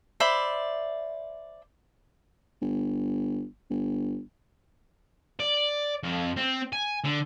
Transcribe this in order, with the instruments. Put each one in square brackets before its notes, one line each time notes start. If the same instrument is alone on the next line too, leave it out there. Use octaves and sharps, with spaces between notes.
[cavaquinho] C5 D5 E5 B5
[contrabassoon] G1
G1
[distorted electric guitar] D5
F2
C4
G#5
D3